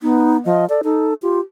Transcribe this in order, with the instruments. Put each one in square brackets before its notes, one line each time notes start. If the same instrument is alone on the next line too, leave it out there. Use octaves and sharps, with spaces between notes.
[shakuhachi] B3 [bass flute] D#4
[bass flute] F3 [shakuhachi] D#5
[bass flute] A4 [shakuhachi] D5
[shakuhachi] D#4 [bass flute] A4
[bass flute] F4 [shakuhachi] G4